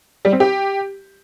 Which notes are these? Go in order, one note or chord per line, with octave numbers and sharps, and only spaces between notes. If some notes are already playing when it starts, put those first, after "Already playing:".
G3
C4
G4